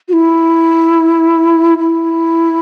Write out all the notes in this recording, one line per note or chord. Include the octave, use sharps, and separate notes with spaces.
F#4
E4
E4